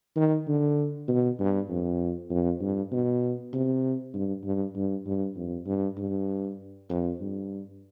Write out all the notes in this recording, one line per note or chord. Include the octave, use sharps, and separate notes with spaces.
D#3
D3
B2
G2
F2
F2
G2
B2
C3
G2
G2
G2
G2
F2
G2
G2
F2
G2